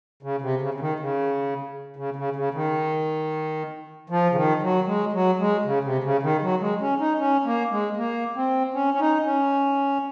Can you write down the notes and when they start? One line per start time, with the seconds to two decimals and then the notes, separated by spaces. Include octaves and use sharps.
0.23 C#3
0.42 C3
0.62 C#3
0.74 C#3
0.80 D#3
1.00 C#3
1.96 C#3
2.16 C#3
2.36 C#3
2.54 D#3
4.10 F3
4.32 C#3
4.35 D#3
4.62 F#3
4.87 G#3
5.13 F#3
5.39 G#3
5.65 C#3
5.84 C3
6.03 C#3
6.23 D#3
6.42 F#3
6.61 G#3
6.81 C#4
7.00 D#4
7.19 C#4
7.45 A#3
7.71 G#3
7.97 A#3
8.36 C4
8.74 C#4
8.94 C#4
9.00 D#4
9.26 C#4